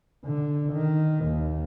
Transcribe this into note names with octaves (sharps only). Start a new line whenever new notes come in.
D3
D#3
D#2